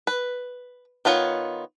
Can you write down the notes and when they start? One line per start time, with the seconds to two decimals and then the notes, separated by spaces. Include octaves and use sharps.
0.07 B4
1.05 D#3 B3 F4 C#5